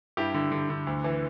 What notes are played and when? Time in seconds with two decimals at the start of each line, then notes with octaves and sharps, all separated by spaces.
0.17 G2 E4 G4
0.34 D3
0.52 D3
0.70 D3
0.87 D2
1.04 E3